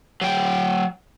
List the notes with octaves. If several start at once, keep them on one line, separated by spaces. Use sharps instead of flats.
F#3 G5